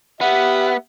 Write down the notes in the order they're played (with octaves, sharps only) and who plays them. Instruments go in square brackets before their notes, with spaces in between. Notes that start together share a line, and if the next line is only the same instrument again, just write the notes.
[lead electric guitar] B3 [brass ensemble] G4 [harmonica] E5 F#5